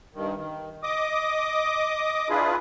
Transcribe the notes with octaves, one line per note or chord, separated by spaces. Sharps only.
G2 D#3
D#3
D#5 D6 D#6
D4 E4 F4 G#4 B4